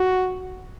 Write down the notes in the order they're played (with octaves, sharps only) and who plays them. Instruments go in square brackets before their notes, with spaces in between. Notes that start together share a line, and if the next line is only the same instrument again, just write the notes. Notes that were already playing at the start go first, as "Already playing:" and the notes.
Already playing: [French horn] F#4